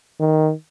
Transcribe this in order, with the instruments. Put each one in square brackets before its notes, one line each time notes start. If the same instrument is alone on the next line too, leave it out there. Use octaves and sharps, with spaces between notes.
[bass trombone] D#3